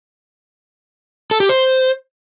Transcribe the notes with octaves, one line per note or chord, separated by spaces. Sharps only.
A4
G4
C5